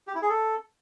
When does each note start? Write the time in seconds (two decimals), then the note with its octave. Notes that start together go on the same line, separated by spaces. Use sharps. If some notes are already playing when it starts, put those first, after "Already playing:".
0.07 G4
0.15 E4
0.22 G#4
0.29 A4